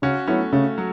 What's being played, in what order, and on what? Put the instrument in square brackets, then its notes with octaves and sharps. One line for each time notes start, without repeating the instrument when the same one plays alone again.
[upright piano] C#3 [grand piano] C#4 F#4
[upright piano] F#3 B3 E4 [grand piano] A3 C#4
[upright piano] C#3 [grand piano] A3
[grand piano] F#3